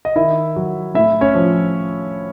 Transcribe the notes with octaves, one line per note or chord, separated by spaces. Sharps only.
D#5
D#3 E4 E5
F#3
A2 E4 E5
C#4 C#5
F3